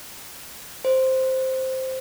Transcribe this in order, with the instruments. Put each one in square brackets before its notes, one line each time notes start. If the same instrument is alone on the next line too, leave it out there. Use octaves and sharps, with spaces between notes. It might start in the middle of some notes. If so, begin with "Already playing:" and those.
[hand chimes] C5